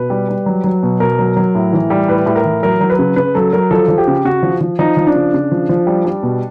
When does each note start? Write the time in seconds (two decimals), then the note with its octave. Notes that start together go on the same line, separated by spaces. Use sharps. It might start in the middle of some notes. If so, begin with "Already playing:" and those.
Already playing: B2 B4
0.10 G3
0.29 G3
0.46 F#3
0.64 F#3
0.83 B2
1.00 B2 A#4
1.19 F#3
1.37 F#3
1.55 A2
1.73 E3
1.90 G3
2.08 A2 B4
2.26 A2
2.36 A#4
2.45 E3
2.63 F#3 A#4
2.81 F#3
2.90 B4
2.99 C#3
3.16 C#3 B4
3.35 F#3 A4
3.53 F#3 A#4
3.71 F3 A4
3.88 F3
3.98 G4
4.07 C#3
4.25 C#3 F#4
4.43 F3
4.61 F3
4.79 F3 D#4
4.97 F3
5.06 D4
5.15 C#3
5.33 C#3
5.52 F3
5.69 F3
5.87 G3
6.05 G3
6.23 B2